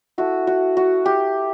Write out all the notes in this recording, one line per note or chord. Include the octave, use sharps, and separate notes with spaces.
A3 E4 F#4
F#4
F#4
G4